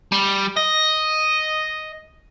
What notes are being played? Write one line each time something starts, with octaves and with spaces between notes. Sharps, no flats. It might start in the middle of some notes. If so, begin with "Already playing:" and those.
G3
D#5